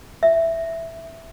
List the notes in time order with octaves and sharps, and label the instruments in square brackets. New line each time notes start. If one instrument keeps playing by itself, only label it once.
[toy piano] E5